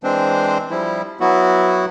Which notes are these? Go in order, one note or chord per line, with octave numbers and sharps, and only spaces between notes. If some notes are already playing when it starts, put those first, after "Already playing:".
E3 G#3 C4 D4 C5
F3 G3 E4
F#3 B3 E4 F#4